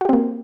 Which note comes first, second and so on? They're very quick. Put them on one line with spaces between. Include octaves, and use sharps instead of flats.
F#4 G4 C4 A#3